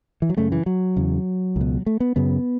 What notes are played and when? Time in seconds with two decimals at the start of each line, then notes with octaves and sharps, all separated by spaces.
0.22 E3
0.29 F#3
0.37 F#2 C#3 A3
0.52 E3
0.66 F#3
0.96 E2 C#3
1.56 C#2 B2
1.86 A3
2.00 B3
2.16 F#2 C#3 B3